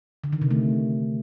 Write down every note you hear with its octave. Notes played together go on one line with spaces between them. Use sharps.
D3
D#3
C3
A3